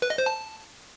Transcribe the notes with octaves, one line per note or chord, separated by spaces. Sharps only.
B4
D#5
C5
A5